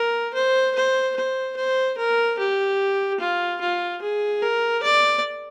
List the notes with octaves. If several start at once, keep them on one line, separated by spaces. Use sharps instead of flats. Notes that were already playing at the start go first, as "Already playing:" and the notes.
Already playing: A#4
C5
C5
C5
C5
A#4
G4
F4
F4
G#4
A#4
D5